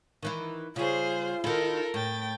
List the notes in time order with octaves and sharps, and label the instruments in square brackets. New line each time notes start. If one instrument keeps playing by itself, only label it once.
[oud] D#3 E3 E4
[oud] C#3 G3 [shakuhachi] F4 [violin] G#4 C5
[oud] D#3 E4 [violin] A4 A#4
[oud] A2 [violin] G5 A6